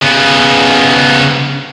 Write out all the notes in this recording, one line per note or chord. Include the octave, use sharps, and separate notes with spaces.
C#3 B3